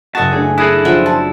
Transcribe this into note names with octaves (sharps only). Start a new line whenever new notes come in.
F#1 F#4 D#5 E5 A5 F#6
A3 D4 G#4
E4 G#4 A4 D#6 F#6 A#6 D7
F3 D4 E5 F#5
F#4 A5